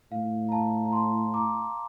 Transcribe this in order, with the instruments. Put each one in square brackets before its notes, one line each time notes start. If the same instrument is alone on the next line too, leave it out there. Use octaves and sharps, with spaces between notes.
[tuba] A2 [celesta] F5
[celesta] A#5
F5 A5
A#5
A5 C6
A#5 D6